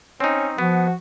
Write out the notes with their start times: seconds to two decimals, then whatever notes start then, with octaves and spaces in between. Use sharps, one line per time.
0.20 C4 C#4 D#4
0.58 F3 B3 F#4